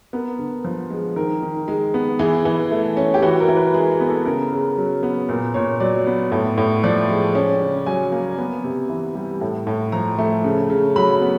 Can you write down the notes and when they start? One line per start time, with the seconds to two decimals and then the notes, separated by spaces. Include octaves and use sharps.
0.13 B3 A#4
0.39 D3
0.64 F3
0.90 G#3
1.16 D#3 A#4
1.42 D#3
1.68 G#3
1.94 B3
2.19 E3 G#4
2.45 E3
2.71 A3
2.97 C#4
3.14 G4
3.22 E3 F#4
3.40 A#4
3.48 E3
3.57 B4
3.74 G#3 G#4
3.91 G#4
4.00 B3
4.09 A4
4.25 C#3 A#4
4.52 C#3
4.77 F#3
5.03 B3
5.29 A#2 A#4
5.54 A#2 C#5
5.80 F#3 D5
6.06 B3
6.32 A2
6.57 A2
6.84 F3 D5
7.09 G#3
7.35 C#4
7.61 C#3
7.86 F#3 G#5
8.12 A#3
8.38 B3
8.64 C3
8.89 E3
9.15 G3
9.41 A2
9.67 A2
9.92 F3 A#5
10.18 A3
10.44 C#3
10.70 C#3
10.96 F#3 B5
11.21 B3